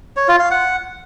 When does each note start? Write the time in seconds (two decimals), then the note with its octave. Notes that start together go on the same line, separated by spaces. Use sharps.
0.17 C#5
0.28 F4
0.39 F5
0.51 F#5